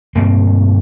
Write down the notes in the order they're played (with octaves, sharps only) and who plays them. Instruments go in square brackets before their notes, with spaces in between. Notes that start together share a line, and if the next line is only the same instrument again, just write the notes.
[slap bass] G2 B2 A#3 C4